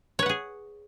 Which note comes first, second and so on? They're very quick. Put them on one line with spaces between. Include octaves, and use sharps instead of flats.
C#5 B4 F#5 G#4